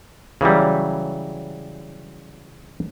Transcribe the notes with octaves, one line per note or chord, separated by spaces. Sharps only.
C#3 E3 F#3 G3